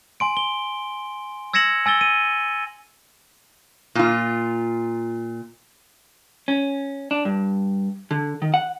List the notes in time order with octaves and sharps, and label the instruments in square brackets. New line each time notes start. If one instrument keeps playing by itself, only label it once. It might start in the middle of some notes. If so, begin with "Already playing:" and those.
[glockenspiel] G#5 C6 D7
G7
E6 G#6 A#6 C#7 E7 F#7
G#5 E6 A6 G7
D#7
[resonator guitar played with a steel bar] A#2 F4
[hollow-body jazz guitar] C#4
D4
G2
D3
D#3
F#5